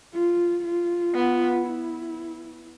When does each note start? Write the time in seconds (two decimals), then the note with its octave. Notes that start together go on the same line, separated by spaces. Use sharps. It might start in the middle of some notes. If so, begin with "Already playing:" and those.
0.13 F4
0.65 F4
1.15 B3
1.66 E4